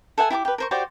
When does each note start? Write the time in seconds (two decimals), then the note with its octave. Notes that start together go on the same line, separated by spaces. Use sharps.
0.18 A4 E5 F#5 G#5
0.30 E4 G4 A5 D6
0.45 G4 B4
0.58 A#4 C5 C#6
0.71 F#4 G4 C5 D5